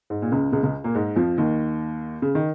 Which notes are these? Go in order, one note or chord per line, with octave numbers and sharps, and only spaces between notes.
G#2
A#2
C#2 C#3
C#2 C#3
C#2 C#3
A#2 A#3
G#2 G#3
F2 F3
D#2 D#3
C#3
D#3